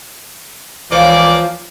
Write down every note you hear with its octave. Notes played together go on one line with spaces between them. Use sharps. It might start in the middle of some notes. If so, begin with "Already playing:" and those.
C#2 E3 F3 A#3 F4 C#5 D5 D6